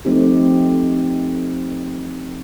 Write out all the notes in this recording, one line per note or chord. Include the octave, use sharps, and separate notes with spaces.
F3 A3 C4 D#4 G4